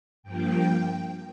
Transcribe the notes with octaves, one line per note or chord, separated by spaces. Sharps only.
G2 F3 A#3 G5